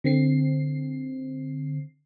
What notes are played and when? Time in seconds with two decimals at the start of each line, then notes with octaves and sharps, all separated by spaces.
0.04 D3 C4 C7